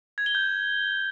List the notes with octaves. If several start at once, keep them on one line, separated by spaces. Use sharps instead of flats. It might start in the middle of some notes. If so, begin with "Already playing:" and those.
G#6
G7
G6